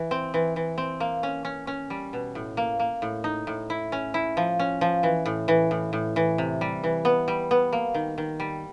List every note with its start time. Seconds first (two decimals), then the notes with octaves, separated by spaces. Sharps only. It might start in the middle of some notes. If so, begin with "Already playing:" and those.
Already playing: E3
0.11 C4
0.34 E3
0.56 E3
0.78 C4
1.00 A#3
1.23 C#4
1.45 C#4
1.67 C#4
1.90 G3
2.13 B2
2.35 A2
2.57 A#3
2.79 A#3
3.02 A2
3.24 D#4
3.47 A2
3.70 E4
3.92 C#4
4.14 E4
4.37 F3
4.59 C#4
4.81 F3
5.03 E3
5.26 A2
5.48 E3
5.71 A2
5.93 A2
6.16 E3
6.38 C3
6.61 G3
6.84 E3
7.05 B3
7.28 G3
7.51 B3
7.73 A#3
7.94 D#3
8.18 D#3
8.40 G3